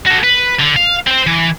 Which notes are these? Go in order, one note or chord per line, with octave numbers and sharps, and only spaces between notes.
F#4 A4
B4
D3
F5
C4 C5
E3